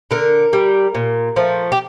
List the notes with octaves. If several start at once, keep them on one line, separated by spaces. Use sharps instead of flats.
D3 A#4
G3
A#2
F3 A3
G4